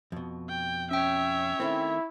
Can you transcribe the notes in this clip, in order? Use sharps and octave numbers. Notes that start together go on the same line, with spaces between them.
F2 B2
G5
C#4 C#5 E5 G5
D#3 A3 C4 E4